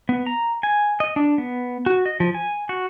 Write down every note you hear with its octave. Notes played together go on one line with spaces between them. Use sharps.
B3
A#5
G#5
D#5
D4
B3
F#4
D#5
F3
G#5
F#4